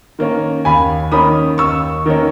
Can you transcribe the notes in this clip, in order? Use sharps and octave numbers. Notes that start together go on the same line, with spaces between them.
D#3 A#3 C#4
D#2 G#5 B5
D#3 A#3 C#4 B5 D#6
D#2 C#6 E6
D#3 A#3 C#4